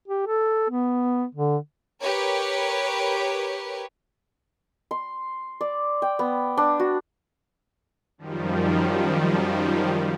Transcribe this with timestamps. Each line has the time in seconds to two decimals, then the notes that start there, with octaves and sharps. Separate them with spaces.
0.08 G4
0.27 A4
0.70 B3
1.35 D3
2.00 G4 A#4 B4 C#5
4.91 C6
5.61 D5
6.02 G5
6.19 B3
6.57 D4
6.80 F#4
8.18 F#2 D#3 F3 G3